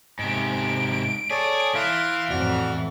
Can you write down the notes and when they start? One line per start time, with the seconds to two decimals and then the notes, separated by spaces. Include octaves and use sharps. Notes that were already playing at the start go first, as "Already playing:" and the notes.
0.19 G#2 C3 D7
1.31 G#4 A4 C#5 D5
1.75 E3 E4 F5 C6
2.30 F2 A2 F#4 D5 F6